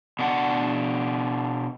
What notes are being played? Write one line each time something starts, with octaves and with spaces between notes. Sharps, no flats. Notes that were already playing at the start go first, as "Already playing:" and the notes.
B2 D4 F#5